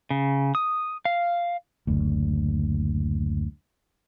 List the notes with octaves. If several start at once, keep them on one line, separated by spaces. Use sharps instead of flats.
C#3
D#6
F5
F#1 D2